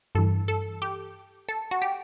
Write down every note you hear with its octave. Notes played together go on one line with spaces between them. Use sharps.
G2 E3 A4
A4
G4
A4
F#4
G4